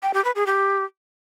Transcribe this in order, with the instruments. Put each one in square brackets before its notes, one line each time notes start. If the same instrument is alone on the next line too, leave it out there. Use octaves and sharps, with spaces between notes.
[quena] G5
G4
B4
G#4
G4